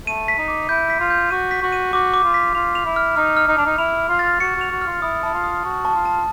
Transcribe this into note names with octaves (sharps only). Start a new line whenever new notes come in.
A3 D#7
B6
D#4
D6
E4 G6
B6
F4
G6
F#4 D#7
B6
F#4
D#7
F#4 D6
D6
F4
B6
F4 F7
F7
E4
F6
D#4 F6
F6
D#4
D4 F7
D#4
E4 F7
F6
F4
A6
F#4 C#7
F#4 F7
F#4
F6
F4
E4 D#6
E4 A5
F4
D#6
F#4 A5
A5
F4
A5